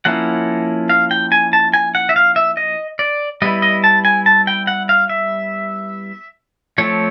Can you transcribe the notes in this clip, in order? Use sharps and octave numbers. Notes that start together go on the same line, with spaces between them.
F3 A#3 C#4 E4 F#5
F5
G5
G#5
A5
G#5
F#5
E5
F5
E5
D#5
D5
G3 B3 E4 D#5
D#5
A5
G#5
A5
G5
F#5
F5
E5
F3 A3 C4 C#5